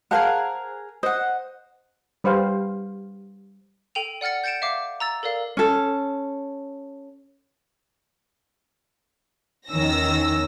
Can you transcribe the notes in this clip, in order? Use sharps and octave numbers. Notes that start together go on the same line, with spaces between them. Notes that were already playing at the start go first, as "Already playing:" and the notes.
G#4 A#4 C5 F5 F#5 A5
C5 D#5 F#5
G3 B4 C5 F5 G5
A4 G5 D#7 F7
D5 F#5 F6 A6 C#7
G6 A6 C#7 D7 E7
E5 F5 D6
A#5 E6 A6
A4 A#4 D5 F5
C#4 A4
E2 D#3 C#4 E6 A#6